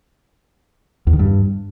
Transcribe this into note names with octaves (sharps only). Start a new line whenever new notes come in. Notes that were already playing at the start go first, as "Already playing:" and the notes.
E2
D#3
G2